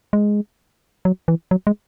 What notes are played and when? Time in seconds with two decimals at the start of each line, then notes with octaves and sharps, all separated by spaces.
0.13 G#3
1.05 F#3
1.28 E3
1.51 F#3
1.67 G#3